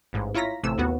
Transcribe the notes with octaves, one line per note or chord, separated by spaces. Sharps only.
A1 G#2
E4 F4 C#5 A#5 A#6 B6
A1 C3 E3 A3 E6
D#2 B3 F#4